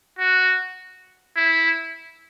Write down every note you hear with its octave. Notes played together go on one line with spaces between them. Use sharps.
F#4
E4